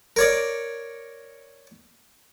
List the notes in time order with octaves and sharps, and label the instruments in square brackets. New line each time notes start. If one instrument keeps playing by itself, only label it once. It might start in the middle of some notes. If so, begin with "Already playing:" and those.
[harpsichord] A#4 C#5 D5